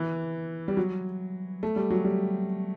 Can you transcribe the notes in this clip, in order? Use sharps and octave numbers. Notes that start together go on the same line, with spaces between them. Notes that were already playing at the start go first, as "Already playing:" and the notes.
Already playing: E3
G3
F#3
A3
G3
F#3
G3